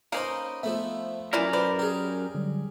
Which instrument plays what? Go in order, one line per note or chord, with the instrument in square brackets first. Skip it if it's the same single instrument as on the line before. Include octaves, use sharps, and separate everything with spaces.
[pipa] A#3 D#4 [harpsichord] C#4 B4 C5
[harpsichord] F3 A3 B3 [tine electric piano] C5 E5
[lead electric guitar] F#2 A#4 [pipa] E3 E4 D5 [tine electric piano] F4 G#5
[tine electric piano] B4 B5 [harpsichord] C5 [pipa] D5
[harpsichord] G4 G#4 [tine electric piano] A#5
[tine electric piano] D3 F#3 G3